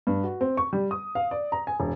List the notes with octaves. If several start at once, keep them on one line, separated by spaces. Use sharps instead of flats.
G2
F#4
C4
C#6
G3
D#6
F5
D5
A#5
G#5
E1